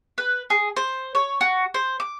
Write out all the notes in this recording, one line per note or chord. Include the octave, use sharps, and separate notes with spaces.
B4
G#4
C5
C#5
F#4
C5
D6